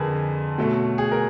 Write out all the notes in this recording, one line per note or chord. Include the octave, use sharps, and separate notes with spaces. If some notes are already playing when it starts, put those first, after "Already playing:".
Already playing: F2 D3 G#4 A#4 B4
B2 F#3 A3
G#4
A#4